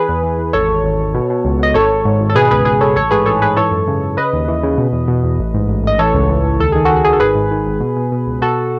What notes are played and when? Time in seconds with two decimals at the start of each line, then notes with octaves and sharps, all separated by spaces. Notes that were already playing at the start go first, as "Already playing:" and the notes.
Already playing: E3 G#4 B4
0.09 E2
0.23 E3
0.38 E2
0.53 G#1 A4 C#5
0.68 G#1
0.84 G#1
1.00 G#1
1.14 B2
1.30 B2
1.45 C#2
1.59 B2 D#5
1.74 G#1 A4 C#5
1.89 G#1
2.05 G#2
2.20 G#1
2.30 A4
2.35 B2 G#4 B4
2.51 C#2 G#4 B4
2.65 C#2 G#4 B4
2.81 C#2 A4 C#5
2.96 A1 A4 C#5
3.11 G#2 G#4 B4
3.26 A1 A4 C#5
3.41 G#2 G#4 B4
3.57 E3 A4 C#5
3.71 F#2
3.88 C#3
4.02 C#3
4.17 C#3 B4 D#5
4.33 D#2
4.48 E3
4.63 C#3
4.78 B2
4.92 E2
5.08 B2
5.24 E2
5.39 A1
5.54 G#2
5.68 A1
5.84 A1 D#5
5.99 E3 A4 C#5
6.14 C#2
6.29 E3
6.44 C#2
6.59 D#2 A4
6.72 D#3 G#4
6.85 D#3 F#4 A4
6.96 F#4
7.04 D#3 G#4
7.13 A4
7.20 G#1 G#4 B4
7.35 G#2
7.51 D#3
7.66 G#1
7.80 B2
7.96 B2
8.12 B2
8.27 C#2
8.42 B2 F#4 A4